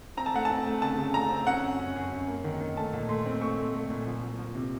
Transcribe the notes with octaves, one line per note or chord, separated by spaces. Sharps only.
C4 A#5
A5
A3 F#5
A5
C4
A3
C#3 A5
C#3
A3 A#5
C4
C#4 F#5
F#2
C#4
F#2
F#2
A#3
D#3
D#3
A3 A5
A#2
A3 C6
C4
A3 C#6
A3
A3
A#2
F3
F3
F3
C3